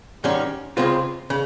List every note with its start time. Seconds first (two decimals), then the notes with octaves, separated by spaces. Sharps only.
0.24 G#2 D#3 G3 C#4
0.77 C#2 C#3 G#3 C4 F4
1.30 C#3